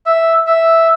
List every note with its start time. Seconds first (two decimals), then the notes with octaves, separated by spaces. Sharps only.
0.06 E5
0.47 E5